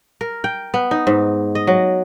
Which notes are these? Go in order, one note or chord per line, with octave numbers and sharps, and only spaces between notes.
A#4
G5
B3
D#4
G#2
D#5
F#3